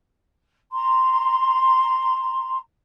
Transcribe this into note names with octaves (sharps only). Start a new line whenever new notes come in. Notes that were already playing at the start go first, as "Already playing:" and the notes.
A#5 C6